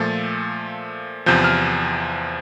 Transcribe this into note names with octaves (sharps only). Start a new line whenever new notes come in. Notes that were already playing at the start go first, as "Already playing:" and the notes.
Already playing: A#2 F3 A3 A6
E2 C3 F3 G6
F6